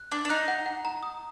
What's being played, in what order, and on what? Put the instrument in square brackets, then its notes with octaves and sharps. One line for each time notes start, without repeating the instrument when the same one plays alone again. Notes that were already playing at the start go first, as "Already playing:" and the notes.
Already playing: [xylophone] F#6
[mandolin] D4 [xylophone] D6
[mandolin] D4
[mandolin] D#4 [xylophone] F#6
[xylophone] F#5
F#5
A#5
D#6